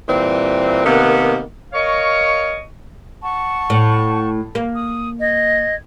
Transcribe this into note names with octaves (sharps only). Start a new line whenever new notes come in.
A#2 E3 G3 C4
C3 D#3 A#3 B3
A#4 C#5 D#5 F5 C#6
F#5 A5 C#6
A2
A#3
D#6
D#5 G#6